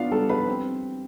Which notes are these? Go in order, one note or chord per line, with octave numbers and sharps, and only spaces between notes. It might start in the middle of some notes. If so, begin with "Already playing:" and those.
Already playing: B3 D4 F4 D5 F5
G3 A4 A5
B4 B5
C4